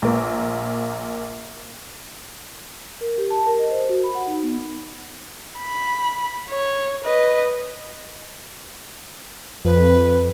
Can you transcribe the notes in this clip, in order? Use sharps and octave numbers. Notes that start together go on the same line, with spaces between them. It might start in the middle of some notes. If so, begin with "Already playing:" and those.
A#1 A#3
A#4
G4
A5
A#4
D#5
C5
F#4
B5
F#5
D#4
B3
B5
C#5
B4 D#5
F2 B4